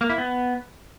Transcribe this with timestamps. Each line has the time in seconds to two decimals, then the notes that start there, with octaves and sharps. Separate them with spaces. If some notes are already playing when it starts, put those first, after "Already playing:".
0.01 A#3
0.09 E4
0.18 B3